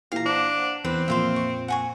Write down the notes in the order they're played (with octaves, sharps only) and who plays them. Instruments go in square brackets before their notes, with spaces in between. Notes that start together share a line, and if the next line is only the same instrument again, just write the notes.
[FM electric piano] A#2 E3 G4 [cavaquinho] F5 A#5
[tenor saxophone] D4 [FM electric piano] C5 F#5
[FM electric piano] E2 [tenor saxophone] C4 [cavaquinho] B4
[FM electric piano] F2 A#2 [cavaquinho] E5 F5 C6
[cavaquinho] C#6
F#5 G#5 C#6